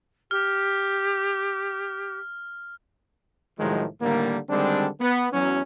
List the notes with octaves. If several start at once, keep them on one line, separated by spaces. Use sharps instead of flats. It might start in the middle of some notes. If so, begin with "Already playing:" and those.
G4 F6
C2 A2 D#3 F3 F#3 G#3
A2 D3 D#3 G3 A#3
D3 D#3 G3 G#3 C4 D4
B3
E2 F#3 C#4